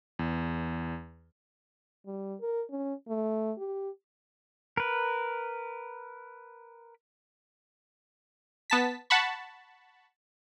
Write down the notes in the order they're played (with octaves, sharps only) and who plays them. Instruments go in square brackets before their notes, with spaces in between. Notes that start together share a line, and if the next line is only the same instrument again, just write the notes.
[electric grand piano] E2
[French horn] G3
A#4
C#4
A3
G4
[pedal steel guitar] A#4 B4
[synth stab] B3 A5 B6
F#5 A5 B5 C#6